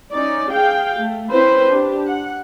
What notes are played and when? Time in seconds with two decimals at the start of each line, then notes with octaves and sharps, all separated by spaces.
0.12 C#4 D#4 D5
0.51 G#4 F5 G5
0.97 A3
1.31 C4 C#4 E4 B4 C5
1.69 D4 G4
2.06 F#5